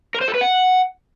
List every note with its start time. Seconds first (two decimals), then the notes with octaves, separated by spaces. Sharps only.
0.15 A#4
0.21 C5
0.28 A4
0.35 B4
0.41 F#5